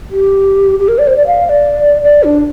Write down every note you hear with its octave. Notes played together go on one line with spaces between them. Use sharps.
G4
G4
A#4
D5
C5
D5
F5
F5
D5
D5
D4